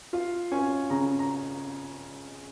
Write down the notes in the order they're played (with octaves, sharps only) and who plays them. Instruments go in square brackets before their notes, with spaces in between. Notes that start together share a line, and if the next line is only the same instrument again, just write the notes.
[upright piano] F4 F5
C#4 G#5
C#3 A#5
A#5